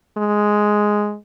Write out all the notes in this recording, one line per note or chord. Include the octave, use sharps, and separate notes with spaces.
G#3